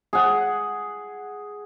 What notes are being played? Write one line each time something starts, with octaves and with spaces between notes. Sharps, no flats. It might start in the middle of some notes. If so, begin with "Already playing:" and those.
G#4 F#5